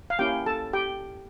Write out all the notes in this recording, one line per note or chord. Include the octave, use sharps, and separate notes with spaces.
F5
A#3 C#4 E4 G4 G5
A4 A5
G4 G5